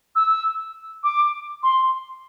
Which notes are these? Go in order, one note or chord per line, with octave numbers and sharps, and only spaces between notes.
E6
D6
C6